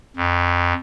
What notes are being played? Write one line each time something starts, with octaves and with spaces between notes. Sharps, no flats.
F2